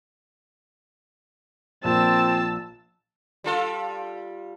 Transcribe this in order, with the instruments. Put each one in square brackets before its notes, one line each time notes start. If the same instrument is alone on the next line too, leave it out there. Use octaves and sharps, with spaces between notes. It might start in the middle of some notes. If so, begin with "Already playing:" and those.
[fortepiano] A#1 [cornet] C4 [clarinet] F4 [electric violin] A5 E6
[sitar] G3 F4 A4